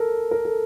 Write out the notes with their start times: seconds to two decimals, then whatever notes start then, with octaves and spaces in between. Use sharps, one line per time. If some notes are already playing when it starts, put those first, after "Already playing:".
Already playing: A4 A#4
0.31 A#4
0.45 A4